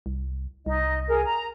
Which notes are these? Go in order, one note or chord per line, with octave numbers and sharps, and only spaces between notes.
C2
C2 D#4 D#5
G#4 A#4
A#5